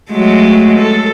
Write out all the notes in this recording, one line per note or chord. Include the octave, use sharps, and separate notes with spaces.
F#3 G#3 A3
A4